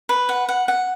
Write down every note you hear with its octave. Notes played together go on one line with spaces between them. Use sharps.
B4
F#5
F#5
F#5